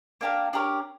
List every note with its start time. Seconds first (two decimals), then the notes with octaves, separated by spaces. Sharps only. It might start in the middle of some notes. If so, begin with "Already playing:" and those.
0.21 A#3 D4 G4 A#4
0.53 D4 G4 A#4 C#5